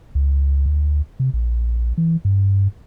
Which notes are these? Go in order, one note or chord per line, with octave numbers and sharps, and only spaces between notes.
C#2
D2
C3
A#1
E3
G2